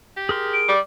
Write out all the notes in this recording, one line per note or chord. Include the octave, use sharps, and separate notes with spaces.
G4
G#4 A#4 C6
D7
G3 D5